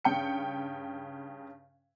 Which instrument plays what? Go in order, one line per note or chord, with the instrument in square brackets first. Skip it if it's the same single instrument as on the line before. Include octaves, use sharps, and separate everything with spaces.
[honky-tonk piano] G2 C#3 G5 C#7